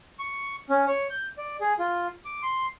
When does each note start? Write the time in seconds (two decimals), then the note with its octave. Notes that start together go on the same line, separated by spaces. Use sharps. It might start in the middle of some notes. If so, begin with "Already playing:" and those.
0.19 C#6
0.70 C#4
0.88 C#5
1.10 G6
1.38 D5
1.61 G#4
1.79 F4
2.25 D6
2.43 C6